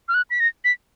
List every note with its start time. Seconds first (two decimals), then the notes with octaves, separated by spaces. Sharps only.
0.09 F6
0.14 F#6
0.30 B6
0.40 A#6
0.65 B6